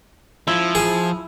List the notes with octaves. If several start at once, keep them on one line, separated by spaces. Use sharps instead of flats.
F3 E4
G#4